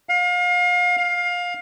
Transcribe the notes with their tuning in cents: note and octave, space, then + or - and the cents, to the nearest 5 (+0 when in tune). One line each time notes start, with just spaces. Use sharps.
F5 +35
F5 +20